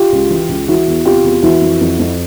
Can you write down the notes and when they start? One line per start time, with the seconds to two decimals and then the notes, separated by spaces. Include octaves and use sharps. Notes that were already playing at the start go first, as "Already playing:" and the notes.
Already playing: F4 G4
0.13 C#2
0.30 E3
0.49 C#2
0.68 E3 E4 F#4
0.88 E2
1.05 C3 F4 G4
1.24 E2
1.43 E3 E4 F#4
1.61 F2
1.81 F2
1.99 F2